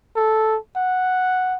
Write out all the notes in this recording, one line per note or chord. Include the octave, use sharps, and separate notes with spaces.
A4
F#5